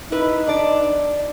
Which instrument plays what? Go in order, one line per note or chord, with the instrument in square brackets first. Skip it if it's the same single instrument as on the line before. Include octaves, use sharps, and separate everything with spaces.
[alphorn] D#4 [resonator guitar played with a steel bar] E4 B4
[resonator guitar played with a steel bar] D4 D5